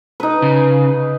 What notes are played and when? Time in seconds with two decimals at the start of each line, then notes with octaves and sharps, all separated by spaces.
0.20 D#4 B4
0.42 C#3